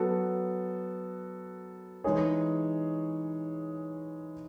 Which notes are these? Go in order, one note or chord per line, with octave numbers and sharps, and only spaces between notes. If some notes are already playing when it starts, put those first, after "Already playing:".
Already playing: F#3 B3 F#4 A4
E3 G#3 D#4 G#4 C#5